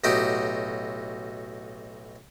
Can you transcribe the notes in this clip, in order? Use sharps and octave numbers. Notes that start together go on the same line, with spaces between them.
B1 A2 D#4 F#4 G4